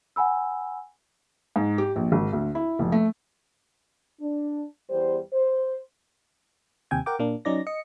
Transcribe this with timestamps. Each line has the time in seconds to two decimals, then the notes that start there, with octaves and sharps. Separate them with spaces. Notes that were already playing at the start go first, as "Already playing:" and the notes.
0.16 F#5 G#5 B5 E6
1.56 G#2
1.78 G4
1.96 A#1
2.12 G#1
2.33 D2
2.55 E4
2.79 F1
2.92 A3
4.21 D4
4.90 E2 G3 C5
5.33 C5
6.91 D#2 C3 G5 G#5 G#6
7.06 A#4 F#5 G5 D6
7.19 A#2 A#3 D4
7.45 F#3 C#4 D#4 D5 A#6
7.67 D#5 C#7